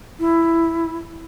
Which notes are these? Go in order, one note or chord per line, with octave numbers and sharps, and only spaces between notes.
E4